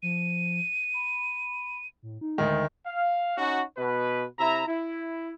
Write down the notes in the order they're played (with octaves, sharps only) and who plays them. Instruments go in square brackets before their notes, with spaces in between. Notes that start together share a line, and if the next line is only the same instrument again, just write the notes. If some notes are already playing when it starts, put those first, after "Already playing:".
[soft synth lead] F3 [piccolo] D#7
[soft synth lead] B5
A2
D#4
[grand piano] D2 D#3 [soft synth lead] G#3
[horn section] F5
C#4 D#4 F#4
B2 B4
C3 E4 E5 A#5
E4